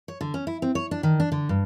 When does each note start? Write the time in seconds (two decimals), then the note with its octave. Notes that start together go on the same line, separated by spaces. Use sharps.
0.08 C#5
0.21 D3
0.34 C#4
0.47 E4
0.62 C4
0.75 C#5
0.91 D4
1.03 D#3
1.20 D4
1.32 D3
1.49 G2